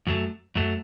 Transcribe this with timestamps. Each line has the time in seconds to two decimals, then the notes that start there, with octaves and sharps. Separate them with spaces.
0.07 F#2 F#3 A3
0.55 F#2 F#3 A3